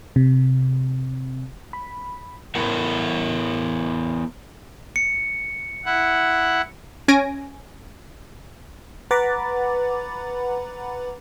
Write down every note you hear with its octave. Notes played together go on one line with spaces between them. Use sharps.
C3
B5
B3 E4 A#4 F#5
C#7
E4 F#5
C#4 G#5 A#6 D7
B4 F#5 A#5 B5 D6 A6